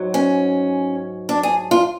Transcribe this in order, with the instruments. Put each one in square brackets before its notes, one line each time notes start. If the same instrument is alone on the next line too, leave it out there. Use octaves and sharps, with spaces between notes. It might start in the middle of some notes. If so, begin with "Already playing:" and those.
Already playing: [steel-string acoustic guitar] G#2 F#3
C#4
D4
G#4
F4